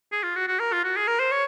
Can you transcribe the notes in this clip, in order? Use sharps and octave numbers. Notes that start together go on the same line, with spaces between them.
G#4
F4
F#4
F#4
A#4
F4
F#4
G#4
A#4
C5
C#5